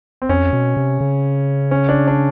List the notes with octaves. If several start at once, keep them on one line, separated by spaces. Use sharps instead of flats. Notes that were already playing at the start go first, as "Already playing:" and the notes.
C4
F2 C#4
B2
C3
C#3
C#4
D4
D4